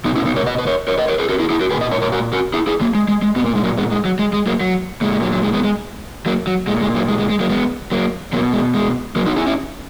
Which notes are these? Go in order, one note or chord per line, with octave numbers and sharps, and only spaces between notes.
B2 B3 D#4
C#4 E4
B3 D#4
A#4 C#5
B4 D#5
B4
A#4 C#5
A#4 C#5
B4 D#5
A#4 C#5
G#4 B4
F#4 A#4
E4 G#4
E4 G#4
F#4 A#4
A#2 G#4 B4
B4 D#5
A#4 C#5
A#4 C#5
F#4 A#4
F#4 A#4
E4 G#4
E4 G#4
F#3 A#3
G#3
G#3
G#3
A#2 B3
A#3
G#3
F#3 A#3
G#3 B3
G#3
F#3
G#3
G#3
F#3 A#3
F#3
A#2 G#3
G#3
F#3
F#3
G#3
G#3 B3
G#3
F#3 A#3
F#3
A#2 G#3
G#3
F#3 A#3
G#3
G#3
G#3
F#3 A#3
G#3 B3
F#3 A#3
B2 F#3 A#3
G#3
G#3
F#3 A#3
D#4 F#4
E4 G#4
C#4 E4